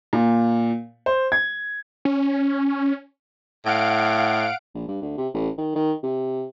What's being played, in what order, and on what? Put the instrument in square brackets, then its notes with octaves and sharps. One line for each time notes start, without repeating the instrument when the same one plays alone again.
[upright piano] A#2
C5
G#6
[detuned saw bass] C#4
[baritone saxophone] A2 [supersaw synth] F5 F#5 D7
[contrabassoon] A#1
G2
D2
C3
A1
D#3
D#3
C3